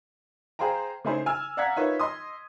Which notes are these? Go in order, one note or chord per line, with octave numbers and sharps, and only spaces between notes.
G#4 C5 F5 G5 A#5
C#3 A3 D#4 E4 G#4 C5
G#5 E6 F6
D5 F5 F#5 A#5 G#6 B6
D#4 F4 A#4 B4 C#5 E5
D#5 C6 D#6